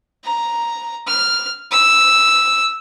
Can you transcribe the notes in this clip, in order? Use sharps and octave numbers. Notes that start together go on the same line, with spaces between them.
A#5
F6
E6